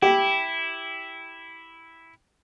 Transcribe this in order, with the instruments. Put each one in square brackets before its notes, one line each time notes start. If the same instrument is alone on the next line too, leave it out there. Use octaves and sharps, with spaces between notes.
[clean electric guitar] E4 [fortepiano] G4